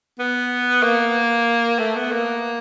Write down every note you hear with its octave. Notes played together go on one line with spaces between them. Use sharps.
B3
A#3
A3
B3
A#3